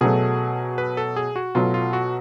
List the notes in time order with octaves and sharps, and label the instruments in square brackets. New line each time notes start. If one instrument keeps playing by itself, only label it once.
[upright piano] B2 F#3 A3 [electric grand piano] G#4
[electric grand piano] B4
A4
G#4
F#4
[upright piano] B2 F#3 A3 [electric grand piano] F4
[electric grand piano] F4
F#4